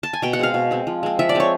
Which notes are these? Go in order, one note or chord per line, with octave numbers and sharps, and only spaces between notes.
A5
G#5
B2 G5
F#5
G#3 C4 F5
B2
G#3 C4
F3
G#3 C4
F3 E5
D5
G#3 C4 C#5